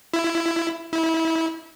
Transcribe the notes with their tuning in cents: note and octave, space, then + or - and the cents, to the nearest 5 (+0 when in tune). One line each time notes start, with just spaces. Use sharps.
E4 +15
E4 -25